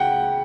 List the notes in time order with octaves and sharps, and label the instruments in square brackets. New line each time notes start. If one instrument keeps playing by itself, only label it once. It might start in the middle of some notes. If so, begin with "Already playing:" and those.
Already playing: [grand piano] C#3 F#5 G5